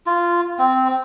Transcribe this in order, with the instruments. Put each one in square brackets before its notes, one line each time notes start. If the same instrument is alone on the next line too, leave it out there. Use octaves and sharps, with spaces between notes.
[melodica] F4
C4